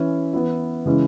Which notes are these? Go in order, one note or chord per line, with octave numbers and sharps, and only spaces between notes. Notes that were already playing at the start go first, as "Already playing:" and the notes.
Already playing: E3 C#4 E4
E3 B3 E4
C#3 E3 G#3 C#4 E4